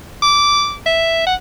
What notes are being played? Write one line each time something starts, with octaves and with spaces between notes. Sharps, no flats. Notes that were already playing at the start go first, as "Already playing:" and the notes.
D6
E5
F#5